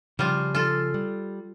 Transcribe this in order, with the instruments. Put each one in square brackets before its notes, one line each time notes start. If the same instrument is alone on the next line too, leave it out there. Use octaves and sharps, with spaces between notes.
[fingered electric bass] C#3 F3 [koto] G3 F4
[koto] F4 A4
[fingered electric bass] G3